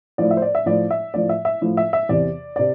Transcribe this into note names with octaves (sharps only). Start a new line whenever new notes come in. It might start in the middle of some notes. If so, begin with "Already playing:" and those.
A2 F3 D5
E5
C5
D5
E5
A2 F3 D5
E5
A2 F3 D5
E5
E5
A2 F3
E5
E5
E2 C3 E3 D5
C3 D5